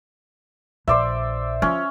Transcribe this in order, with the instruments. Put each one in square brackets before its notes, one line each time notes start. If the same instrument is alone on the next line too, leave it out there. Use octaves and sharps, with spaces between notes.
[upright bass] A#1 [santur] C5 D5 E5
[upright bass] F3 [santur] C#4